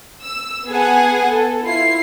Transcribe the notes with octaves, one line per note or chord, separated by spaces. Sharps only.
E6
B3 G#4 F#5 G#5 A5
A4
E4 F4 C7